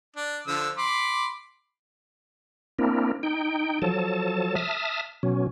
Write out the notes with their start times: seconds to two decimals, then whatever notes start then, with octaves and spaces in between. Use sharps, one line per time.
0.16 D4
0.47 D3 F3 E6
0.78 B5 C6 D6
2.79 A#3 C4 D4 E4 A#4
3.23 D#4 G5
3.82 F3 F#3 A4 A5
4.55 E5 A5 D#6 F6
5.23 B2 F#3 C#4